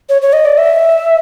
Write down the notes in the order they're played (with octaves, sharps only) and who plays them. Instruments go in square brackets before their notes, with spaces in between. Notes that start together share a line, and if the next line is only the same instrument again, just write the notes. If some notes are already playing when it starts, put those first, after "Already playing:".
[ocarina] C#5
C#5
D#5
D5
E5